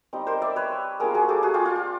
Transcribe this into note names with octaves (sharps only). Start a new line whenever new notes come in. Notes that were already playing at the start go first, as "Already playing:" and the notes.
G3 C4 D#4
A#4 C5
D5 E5
B4 C#5
G3 A#3 D4 F4 G#4 A#4
F#4 G#4
G4 A4
F#4 G#4
F4 G4
F4
F4